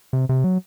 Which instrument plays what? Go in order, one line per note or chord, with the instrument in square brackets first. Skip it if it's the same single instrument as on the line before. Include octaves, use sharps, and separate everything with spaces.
[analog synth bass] C3
C3
F#3